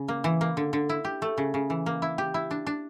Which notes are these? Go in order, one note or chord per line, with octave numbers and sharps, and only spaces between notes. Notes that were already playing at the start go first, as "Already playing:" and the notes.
Already playing: C#3
A#3
E3
A#3
D3
D3
E4
G4
A3
C#3
C#3
E3
A#3
E4
G4
E4
D4
D4